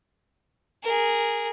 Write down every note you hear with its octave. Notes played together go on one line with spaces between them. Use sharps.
G#4 A#4